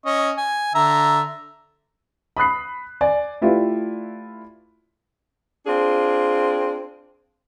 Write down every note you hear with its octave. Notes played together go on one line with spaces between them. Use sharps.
C#4 D#5 C#6
G#5
D3 E5 A#5
B5 D#6 F#6 C7
D5 G#5
A3 E4 F4 G4 B4 D5
C4 D4 F4 G#4